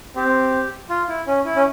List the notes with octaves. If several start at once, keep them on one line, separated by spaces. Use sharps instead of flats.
C4 G4
F4
E4
C#4
E4
C#4